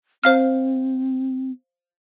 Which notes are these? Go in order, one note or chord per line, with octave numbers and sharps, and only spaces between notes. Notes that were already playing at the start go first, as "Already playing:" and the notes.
C4 C5 F5 F6